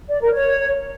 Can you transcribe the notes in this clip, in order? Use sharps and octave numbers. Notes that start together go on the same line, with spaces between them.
D5
A#4
C#5